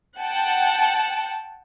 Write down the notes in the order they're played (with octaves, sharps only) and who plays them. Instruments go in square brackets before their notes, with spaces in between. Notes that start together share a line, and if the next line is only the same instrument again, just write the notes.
[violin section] F#5 G5 A5